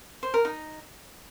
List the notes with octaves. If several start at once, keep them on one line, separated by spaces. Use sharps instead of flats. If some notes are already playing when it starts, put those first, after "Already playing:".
C5
A#4
D#4